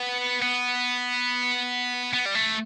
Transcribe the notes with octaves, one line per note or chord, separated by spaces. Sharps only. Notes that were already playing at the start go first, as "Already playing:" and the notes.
Already playing: B3
B3
B3
G3
A3